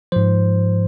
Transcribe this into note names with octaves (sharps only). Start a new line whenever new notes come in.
G#2 F3 C5